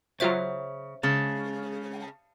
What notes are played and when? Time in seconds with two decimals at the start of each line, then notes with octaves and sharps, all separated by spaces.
0.20 C#3 F#3 F4 C5 C#5 E5 D7
1.03 C#3 G#3 A5